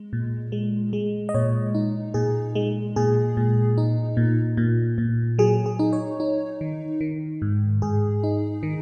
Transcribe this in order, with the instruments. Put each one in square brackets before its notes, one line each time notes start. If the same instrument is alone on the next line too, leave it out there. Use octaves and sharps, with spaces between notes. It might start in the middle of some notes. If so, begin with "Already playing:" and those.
Already playing: [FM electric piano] G#3
A#2
G#3
G#3
D#5
A#2 C#5
D#4
A#2 G#4
G#3
A#2 G#4
A#2
D#4
A#2
A#2
A#2
F#3 G#4
G#4
D#4
C#5
D#4
D#3
D#3
G#2
G#2 G#4
D#4
D#3